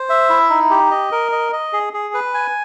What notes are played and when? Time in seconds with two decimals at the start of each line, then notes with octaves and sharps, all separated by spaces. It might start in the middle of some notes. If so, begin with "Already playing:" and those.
Already playing: C5
0.09 E5
0.30 E4
0.50 D#4
0.70 G4
0.91 D#5
1.12 A#4
1.32 D#5
1.52 D#5
1.73 G#4
1.93 G#4
2.14 B4
2.34 G#5